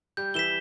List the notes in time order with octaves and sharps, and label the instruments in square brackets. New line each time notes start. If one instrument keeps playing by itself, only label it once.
[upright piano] G3 G4 [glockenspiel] G6
[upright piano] E3 E4 [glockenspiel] B6 E7 G7